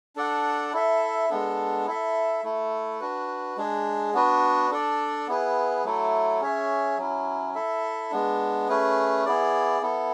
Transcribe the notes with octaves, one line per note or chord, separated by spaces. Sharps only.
D4 A4 D5 F#5
E4 A4 E5
G#3 B3 D4 A4
E4 A4 E5
A3 E4 A4
D4 F#4 B4
G#3 D4 G#4
B3 D4 F#4 B4
D4 A4 D5
B3 E4 G#4 B4
F#3 A3 E4 A4
C#4 G#4 C#5 E5
F#3 C#4 E4
E4 A4 E5
G#3 B3 D4
A3 C#4 G#4 B4
B3 E4 G#4 D5
B3 E4 A4